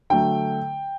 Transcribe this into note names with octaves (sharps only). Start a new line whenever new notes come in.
D3 F#3 A3 G5